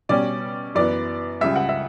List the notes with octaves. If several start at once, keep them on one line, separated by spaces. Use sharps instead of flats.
B2 G3 C#4 D5
F#2 E3 B3 D5
C#2 C#3 G3 E5
F#5
E5